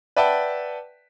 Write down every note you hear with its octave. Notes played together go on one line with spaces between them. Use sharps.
B4 D5 E5 F#5 G5 A5